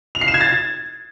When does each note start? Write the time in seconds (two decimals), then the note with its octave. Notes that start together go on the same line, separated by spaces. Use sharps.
0.15 F7
0.21 C7
0.28 E7
0.34 G#6
0.41 A6